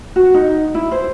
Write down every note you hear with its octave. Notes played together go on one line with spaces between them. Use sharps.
F#4
D#4
E4
C5